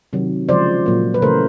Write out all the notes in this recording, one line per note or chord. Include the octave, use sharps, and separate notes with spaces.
C3 D#3 F#3
C#3 F3 G#3 C5 D5
A#2 F#3 A#3
B4
C#3 E3 A3 A#4 C5